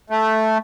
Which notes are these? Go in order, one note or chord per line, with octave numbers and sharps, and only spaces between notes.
A3